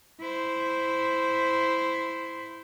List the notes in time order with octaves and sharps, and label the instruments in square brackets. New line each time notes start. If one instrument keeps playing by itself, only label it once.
[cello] E4 C5